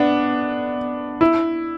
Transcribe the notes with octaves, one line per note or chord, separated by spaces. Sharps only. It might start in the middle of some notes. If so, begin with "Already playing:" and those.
Already playing: B3 D4
E4